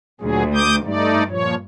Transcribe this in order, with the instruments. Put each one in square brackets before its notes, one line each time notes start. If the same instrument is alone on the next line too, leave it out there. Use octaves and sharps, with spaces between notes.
[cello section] D2 [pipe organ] A#2 F#3 G#4
[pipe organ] D6 D#6 G6
[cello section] G2 [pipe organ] A3 D#4 D5
[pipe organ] A#2 F3 C#5